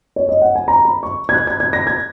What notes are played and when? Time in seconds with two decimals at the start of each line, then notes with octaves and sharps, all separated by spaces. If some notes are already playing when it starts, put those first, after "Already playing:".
0.16 C#5
0.29 D#5
0.42 F#5
0.55 G#5
0.68 A#5
0.85 B5
1.03 C#6
1.29 G#6
1.34 F#6
1.47 G#6
1.60 G#6
1.73 A#6
1.87 G#6